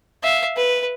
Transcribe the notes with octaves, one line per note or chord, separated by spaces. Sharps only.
E5 F5
B4